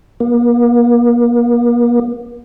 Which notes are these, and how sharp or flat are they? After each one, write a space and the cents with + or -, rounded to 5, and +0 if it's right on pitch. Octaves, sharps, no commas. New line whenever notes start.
A#3 +40